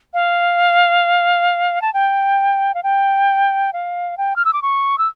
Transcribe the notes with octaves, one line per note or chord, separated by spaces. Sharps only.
F5
A5
G5
F5
G5
F5
G5
F6
E6
D6
C#6
E6